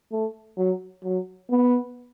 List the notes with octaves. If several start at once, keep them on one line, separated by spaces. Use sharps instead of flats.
A3
F#3
F#3
B3